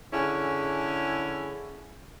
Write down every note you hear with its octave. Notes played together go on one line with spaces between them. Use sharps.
D3 C#4 E4 G#4